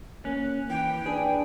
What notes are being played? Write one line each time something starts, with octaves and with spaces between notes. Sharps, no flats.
A#3 C#4 F#6
E3 G5
D4 G#4 B4